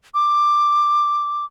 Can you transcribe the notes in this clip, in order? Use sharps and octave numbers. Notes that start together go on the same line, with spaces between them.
D6